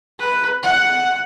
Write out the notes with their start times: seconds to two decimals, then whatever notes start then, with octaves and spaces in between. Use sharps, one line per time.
0.19 B4
0.63 F#5